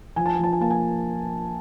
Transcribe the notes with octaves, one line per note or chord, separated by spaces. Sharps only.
F3 G#5
A5
G#5
F3 A5
G#5
A#3 A5
G#5